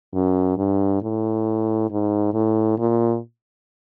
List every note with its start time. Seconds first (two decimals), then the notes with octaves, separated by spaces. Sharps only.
0.14 F#2
0.58 G2
1.02 A2
1.91 G#2
2.34 A2
2.78 A#2